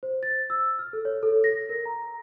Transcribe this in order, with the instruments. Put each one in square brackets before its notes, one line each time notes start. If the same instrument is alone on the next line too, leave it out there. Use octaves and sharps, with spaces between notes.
[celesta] C5
A6
E6
F6
A4
C#5
A4
A#6
A#4
A#5